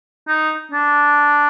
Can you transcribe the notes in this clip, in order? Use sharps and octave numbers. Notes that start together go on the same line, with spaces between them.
D#4
D4